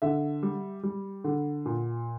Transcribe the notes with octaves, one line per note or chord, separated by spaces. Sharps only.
D3 E5
G3
G3
D3
A#2